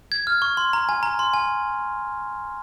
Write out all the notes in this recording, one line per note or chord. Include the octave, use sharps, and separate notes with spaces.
G#6
F6
C#6
C6
A#5
G#5
A#5
C6
G#5